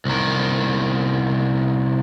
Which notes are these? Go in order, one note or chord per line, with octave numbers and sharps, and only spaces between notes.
C2 D#3